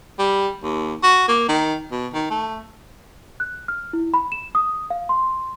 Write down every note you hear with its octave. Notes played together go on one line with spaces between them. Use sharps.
G3
D#2
F#4
A#3
D#3
B2
D#3
A3
F#6
F6
E4
B5
E7
D#6
F5
C6